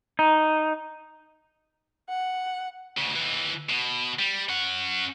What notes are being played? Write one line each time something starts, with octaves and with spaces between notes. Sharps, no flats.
D#4
F#5
D2 C#3
D#2 E3
B2
G3
C#4 F#5